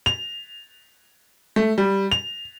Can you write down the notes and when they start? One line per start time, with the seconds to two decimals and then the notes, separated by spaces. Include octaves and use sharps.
0.06 F7
1.56 A3
1.78 G3
2.12 F7